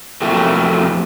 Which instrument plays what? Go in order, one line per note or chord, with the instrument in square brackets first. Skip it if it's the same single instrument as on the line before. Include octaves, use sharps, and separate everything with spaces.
[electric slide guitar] F2 A2 C3 F#3 A3 A#3